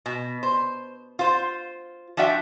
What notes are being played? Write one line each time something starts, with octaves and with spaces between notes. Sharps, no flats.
B2
C5
F4 C5
F3 D4 F#4 E5 G5